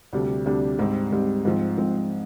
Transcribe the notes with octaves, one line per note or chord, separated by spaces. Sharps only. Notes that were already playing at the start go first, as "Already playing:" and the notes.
D2 C3 G3 D4
D2 C3 G3 D4
G#2 G3 C4
G#2 G3 C4
G#2 F3 C4
G#2 F3 C4